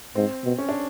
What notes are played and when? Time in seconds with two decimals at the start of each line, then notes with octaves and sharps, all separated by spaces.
0.15 G#2 C4
0.44 B2
0.58 C#4
0.69 D4